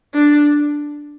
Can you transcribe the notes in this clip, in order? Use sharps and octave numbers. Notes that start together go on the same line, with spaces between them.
D4